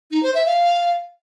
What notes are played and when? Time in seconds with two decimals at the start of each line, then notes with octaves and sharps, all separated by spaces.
0.11 D#4
0.23 C5
0.35 E5
0.46 F5